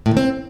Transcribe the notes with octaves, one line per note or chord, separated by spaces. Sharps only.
A2
D#3
C4